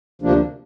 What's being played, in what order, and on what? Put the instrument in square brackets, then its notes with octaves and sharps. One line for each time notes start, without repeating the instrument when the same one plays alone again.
[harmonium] D2 C3 F3 A#3 D4